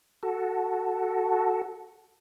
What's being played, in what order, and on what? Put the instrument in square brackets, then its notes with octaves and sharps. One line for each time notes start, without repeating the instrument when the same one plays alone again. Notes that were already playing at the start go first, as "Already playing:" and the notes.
[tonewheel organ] F#4 A4